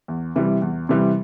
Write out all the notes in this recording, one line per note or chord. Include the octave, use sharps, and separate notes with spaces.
E2
C3 E3 G3
E2
C3 E3 G3